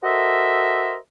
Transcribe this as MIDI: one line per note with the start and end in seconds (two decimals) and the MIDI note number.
0.03 0.95 66
0.03 0.95 69
0.03 0.95 70
0.03 0.95 72
0.03 0.95 75
0.03 0.95 76